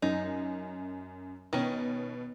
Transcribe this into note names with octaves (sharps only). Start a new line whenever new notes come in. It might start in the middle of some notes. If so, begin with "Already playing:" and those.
F#2 D#4
B2 D#3 C#4